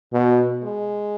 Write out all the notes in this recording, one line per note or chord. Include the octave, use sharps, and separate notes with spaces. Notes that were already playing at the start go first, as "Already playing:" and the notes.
B2 B3
G#3